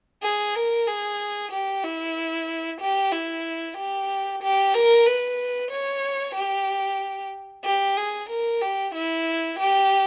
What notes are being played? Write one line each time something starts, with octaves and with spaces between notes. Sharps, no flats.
G#4
A#4
G#4
G4
E4
G4
E4
G4
G4
A#4
B4
C#5
G4
G4
G#4
A#4
G4
E4
G4